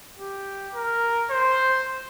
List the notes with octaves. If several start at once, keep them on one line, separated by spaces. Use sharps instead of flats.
G4
A#4
C5